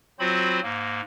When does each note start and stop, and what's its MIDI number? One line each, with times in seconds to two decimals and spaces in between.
0.19 0.60 54
0.19 0.60 60
0.19 0.60 65
0.19 0.60 66
0.19 0.60 72
0.19 0.60 83
0.63 1.01 44
0.63 1.01 58